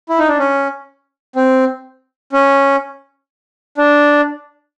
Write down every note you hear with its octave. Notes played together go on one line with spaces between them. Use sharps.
E4
D#4
D4
C#4
C4
C#4
D4